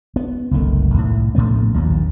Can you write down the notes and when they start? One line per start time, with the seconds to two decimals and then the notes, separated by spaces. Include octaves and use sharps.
0.16 B3
0.51 F#1 C2 D#3 A3
0.94 C2 A2
1.35 A#1 A2 A3 B3
1.74 A#1 D#2 A#2 F#3